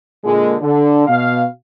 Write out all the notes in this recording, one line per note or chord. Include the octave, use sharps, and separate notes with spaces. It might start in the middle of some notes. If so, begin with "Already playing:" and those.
A#2 D3 G#3
D3
B2 F5